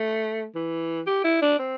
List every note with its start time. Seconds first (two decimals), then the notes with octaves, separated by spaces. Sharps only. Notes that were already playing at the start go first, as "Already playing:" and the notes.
Already playing: A3
0.55 E3
1.07 G4
1.24 E4
1.42 D4
1.59 C4